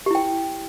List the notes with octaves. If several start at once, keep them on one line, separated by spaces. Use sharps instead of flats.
E4 G4 G5